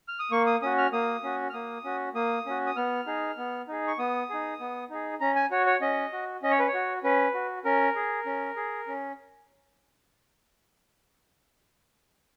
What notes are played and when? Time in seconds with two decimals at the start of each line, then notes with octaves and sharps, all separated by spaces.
0.08 F6
0.19 D#6
0.31 A#3 C#6
0.47 D#6
0.62 C#4 F#4 D#6
0.78 F6
0.92 A#3 D#6
1.24 C#4 F#4
1.50 F6
1.54 A#3 D#6
1.84 C#4 F#4
2.14 A#3 D#6
2.46 C#4 F#4
2.66 D#6
2.76 B3 F6
3.07 D#4 G#4
3.37 B3
3.68 D#4 G#4
3.87 C#6
3.99 B3 D#6
4.29 D#4 G#4
4.60 B3
4.90 D#4 G#4
5.20 C#4 A#5
5.36 G#5
5.51 F#4 C#5
5.66 C#5
5.81 C#4 D#5
6.12 F#4
6.43 C#4 D#5
6.51 C#5
6.59 B4
6.68 C#5
6.74 F#4
7.04 C#4 B4
7.34 F#4
7.65 C#4 A#4
7.95 G#4
8.26 C#4
8.56 G#4
8.88 C#4